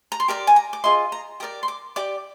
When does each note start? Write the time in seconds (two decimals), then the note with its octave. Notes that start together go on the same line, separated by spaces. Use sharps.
0.12 A#5
0.20 C6
0.28 G4 A#4 D5 D6
0.47 G#5
0.56 A#5
0.73 D6
0.84 F4 G#4 D#5 C6
1.12 A#5
1.40 G4 A#4 D5 D#6
1.63 C6
1.68 D6
1.96 G4 D5 D6